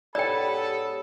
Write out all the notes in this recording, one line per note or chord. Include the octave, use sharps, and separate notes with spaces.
G#2 B3 G4 A4 C#5 D5 G5 B5